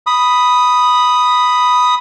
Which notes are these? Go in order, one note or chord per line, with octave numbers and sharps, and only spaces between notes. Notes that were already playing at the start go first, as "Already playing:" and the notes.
B5 D#6